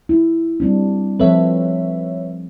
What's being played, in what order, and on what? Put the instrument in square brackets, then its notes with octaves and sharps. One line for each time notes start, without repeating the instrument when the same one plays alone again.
[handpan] E4
G3 C4 D4
[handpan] F3 C4 A4 [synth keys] B4 C#5 E5